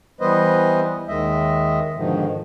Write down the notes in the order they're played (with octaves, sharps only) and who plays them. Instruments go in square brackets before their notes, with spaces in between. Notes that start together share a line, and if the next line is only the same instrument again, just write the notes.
[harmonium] E3 G3 B3 B4 C5 D#5
D#2 D#3 G#3 D#5 E5
G#2 B2 D3 D#3 F3